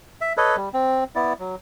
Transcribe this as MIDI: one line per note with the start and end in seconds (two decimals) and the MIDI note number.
0.21 0.33 76
0.37 0.56 69
0.37 0.56 71
0.37 0.56 73
0.37 0.56 75
0.56 0.69 55
0.74 1.04 60
1.16 1.33 59
1.16 1.33 64
1.16 1.33 74
1.40 1.56 54